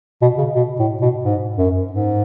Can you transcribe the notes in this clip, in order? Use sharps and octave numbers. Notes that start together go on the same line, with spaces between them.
B2
C#3
B2
A2
B2
G#2
F#2
G#2